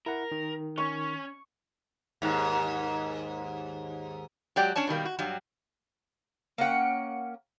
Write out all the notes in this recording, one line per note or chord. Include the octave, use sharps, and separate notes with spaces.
E4 A#4 F#5
D#3
C#4 C#6
D#2 G#2
F#3 G#3 G4 D5 G5
C#4 D4 C#5 A5
B2 D#3 G3 A#3
F#4
G2 F#3 G3
A#3 C#4 F#5 G5